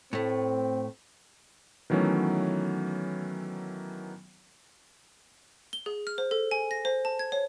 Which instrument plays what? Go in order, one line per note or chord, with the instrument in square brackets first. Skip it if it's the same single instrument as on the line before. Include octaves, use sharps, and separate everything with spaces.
[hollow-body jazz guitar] A2 A3 [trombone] C4
[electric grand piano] D#3 E3 F#3 A3 B3 C#4
[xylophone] G7
G#4
F6
C5
A4
G#5
A#6
C5
A5
G#6
C#5